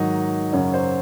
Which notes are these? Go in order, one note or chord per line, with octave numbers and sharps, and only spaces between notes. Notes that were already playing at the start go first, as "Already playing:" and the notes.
Already playing: G#2 D#3 F#3 D#4
F#2 C#3 F#3 C#4
C5